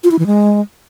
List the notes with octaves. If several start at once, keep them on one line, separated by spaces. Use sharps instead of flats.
F4
E4
E3
G#3